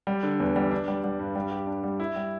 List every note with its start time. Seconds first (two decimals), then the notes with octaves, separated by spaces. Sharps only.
0.07 G3
0.23 D3
0.40 E2
0.56 G3
0.71 D4
0.88 G3
1.04 G3
1.19 G2
1.36 G3
1.51 G4
1.67 D4
1.84 G3
2.00 E4
2.16 G3